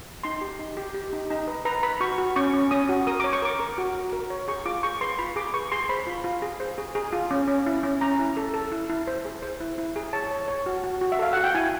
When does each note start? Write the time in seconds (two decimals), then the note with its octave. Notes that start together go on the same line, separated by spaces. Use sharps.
0.23 D#4 C6
0.41 G4
0.59 D#4
0.77 G4
0.94 G4
1.13 D#4
1.30 D#4
1.48 B4
1.65 B4 A#5
1.83 B4 B5
2.00 F#4 C#6
2.18 F#4
2.36 C#4 C#6
2.54 C#4
2.71 C#4 D#6
2.89 F#4
3.07 A#4 D#6
3.20 C#5 D6
3.33 C#6
3.42 A#4 D6
3.60 A#4
3.78 F#4
3.95 F#4
4.13 A#4
4.30 C#5
4.48 G#4 C#6
4.66 F4 D6
4.83 G#4 C#6
5.01 B4 C6
5.19 F4 B5
5.36 G#4 D6
5.54 B4 C#6
5.72 G#4 C6
5.89 C5 B5
6.07 F4
6.24 F4
6.42 G#4
6.60 C5
6.78 G#4
6.95 G#4
7.13 F4
7.31 C#4
7.48 C#4
7.66 E4
7.83 C#4
8.01 C#4 A#5
8.19 E4
8.37 A4
8.54 A4
8.72 E4
8.89 E4
9.07 C5
9.25 G#4
9.42 C5
9.60 E4
9.78 E4
9.96 G#4
10.13 C#5 A5
10.31 C#5
10.48 C#5
10.66 F#4
10.84 F#4
11.01 F#4
11.12 E5
11.19 A4 F5
11.33 F#4 F#5
11.44 G5
11.55 E4 G#5